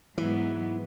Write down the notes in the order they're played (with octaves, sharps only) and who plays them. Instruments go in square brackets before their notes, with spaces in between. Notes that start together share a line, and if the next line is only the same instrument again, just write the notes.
[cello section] G#2 F#3 B3 [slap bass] E3